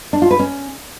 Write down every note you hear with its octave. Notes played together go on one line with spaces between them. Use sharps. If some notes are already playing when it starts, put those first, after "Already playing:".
D4
F4
B4
C#4